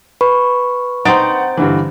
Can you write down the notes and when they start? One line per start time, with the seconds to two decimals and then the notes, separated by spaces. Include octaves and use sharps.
0.21 B4 B5 C#6
1.05 C4 D#4 F#5 A6 D7
1.57 G2 D3 E3